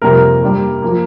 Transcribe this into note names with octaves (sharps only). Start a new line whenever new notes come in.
F2 C3 G3 A#3 A#4
G2 G3 A#3
F3 A#3